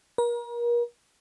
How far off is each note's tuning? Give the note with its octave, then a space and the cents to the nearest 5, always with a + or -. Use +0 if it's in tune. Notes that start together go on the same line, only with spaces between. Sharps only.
A#4 +35